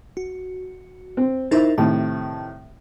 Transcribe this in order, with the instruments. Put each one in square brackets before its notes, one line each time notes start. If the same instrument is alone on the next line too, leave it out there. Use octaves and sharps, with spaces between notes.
[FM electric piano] F#4
[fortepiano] C4
[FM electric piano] D#4 A#4 A6 [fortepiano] E4 C5
[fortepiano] A2 C3 D#3 [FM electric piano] A5